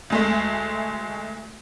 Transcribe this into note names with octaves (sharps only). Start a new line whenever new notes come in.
D2 G#3 A3